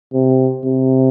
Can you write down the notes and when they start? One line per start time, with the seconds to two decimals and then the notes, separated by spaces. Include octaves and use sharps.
0.14 C3
0.65 C3